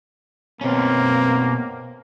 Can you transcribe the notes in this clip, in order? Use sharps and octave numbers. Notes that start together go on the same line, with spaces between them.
B2 A#3 C4 C#4